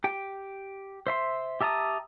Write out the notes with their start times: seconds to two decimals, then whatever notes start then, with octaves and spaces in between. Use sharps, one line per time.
0.04 G4 G5
1.07 C5 E5 C6
1.61 G4 E5 A5 A#5 D#6